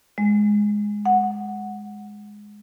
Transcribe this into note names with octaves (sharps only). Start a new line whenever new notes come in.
G#3
F#5